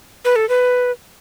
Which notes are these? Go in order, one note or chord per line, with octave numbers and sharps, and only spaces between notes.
B4
A4
B4